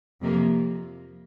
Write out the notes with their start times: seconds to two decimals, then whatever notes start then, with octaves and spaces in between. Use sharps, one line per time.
0.22 F2 C3 F3 A#3